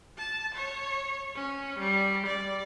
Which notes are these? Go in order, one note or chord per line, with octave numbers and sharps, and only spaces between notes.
A5
C#5
C#4
G3
D5